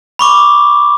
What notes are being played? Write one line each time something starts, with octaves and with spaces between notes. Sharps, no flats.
B5 C#6 D6